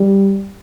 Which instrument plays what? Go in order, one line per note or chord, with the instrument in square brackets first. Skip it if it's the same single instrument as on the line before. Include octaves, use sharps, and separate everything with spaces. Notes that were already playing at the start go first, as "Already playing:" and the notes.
Already playing: [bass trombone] G3